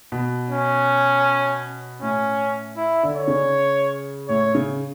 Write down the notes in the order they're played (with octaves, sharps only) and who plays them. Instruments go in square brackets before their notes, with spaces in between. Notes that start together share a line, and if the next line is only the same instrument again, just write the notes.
[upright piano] B2
[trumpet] C#4
[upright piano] A2 [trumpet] C#4
[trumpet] E4
[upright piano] D3
[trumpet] C#5
[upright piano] C#3
[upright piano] A2 [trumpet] C#5
[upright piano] C#3